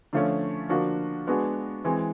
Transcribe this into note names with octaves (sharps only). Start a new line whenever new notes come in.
D3 F3 A3 C#4
D3 F3 A#3 D4 F#4
G#3 B3 D4 F#4
E3 G#3 C4